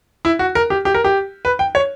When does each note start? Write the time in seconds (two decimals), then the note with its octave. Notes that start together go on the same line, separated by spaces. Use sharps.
0.25 E4
0.39 F#4
0.55 A#4
0.70 G4
0.85 G4
0.94 A#4
1.04 G4
1.45 B4
1.59 G5
1.75 C#5